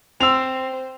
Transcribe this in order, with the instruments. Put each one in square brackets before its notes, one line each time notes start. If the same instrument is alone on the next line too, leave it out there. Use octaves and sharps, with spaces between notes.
[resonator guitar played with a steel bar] C4 [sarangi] C5 [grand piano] E6 F7